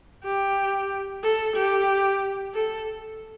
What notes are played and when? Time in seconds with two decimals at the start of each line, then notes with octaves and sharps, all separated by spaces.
0.24 G4
1.23 A4
1.56 G4
2.54 A4